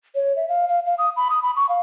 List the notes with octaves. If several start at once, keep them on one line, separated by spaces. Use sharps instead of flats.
C#5
E5
F5
F5
F5
D#6
B5
D#6
B5
C#6
F5